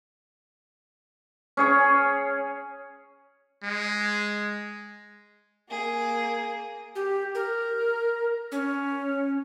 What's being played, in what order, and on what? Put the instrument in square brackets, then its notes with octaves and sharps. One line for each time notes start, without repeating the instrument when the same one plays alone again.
[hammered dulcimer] C#4 G#4 C#5
[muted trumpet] G#3
[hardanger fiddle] A#3 G#4
[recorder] G4
A#4
C#4